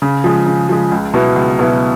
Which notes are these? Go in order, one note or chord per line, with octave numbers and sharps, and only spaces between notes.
C#3
F3 G#3
C#3
F3 G#3
C#2
B2 F#3 B3 E4
C#2
B2 F#3 B3 E4